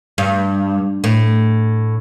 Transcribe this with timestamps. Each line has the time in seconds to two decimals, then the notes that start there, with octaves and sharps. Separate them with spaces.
0.18 G2
1.04 A2